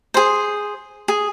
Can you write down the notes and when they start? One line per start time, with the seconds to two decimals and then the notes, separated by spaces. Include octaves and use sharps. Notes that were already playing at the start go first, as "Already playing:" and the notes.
0.14 G#4 C5
1.08 G#4